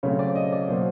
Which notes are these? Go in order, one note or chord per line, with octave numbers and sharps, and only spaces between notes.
C#3 F#3 A3 C4 C#5
D5
D#5
D5
B2 F#3 A#3 C5